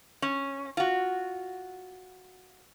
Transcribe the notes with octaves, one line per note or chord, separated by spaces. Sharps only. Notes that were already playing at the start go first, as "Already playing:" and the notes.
C#4
F4 F#4